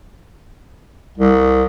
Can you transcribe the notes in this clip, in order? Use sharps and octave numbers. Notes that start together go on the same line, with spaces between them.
C2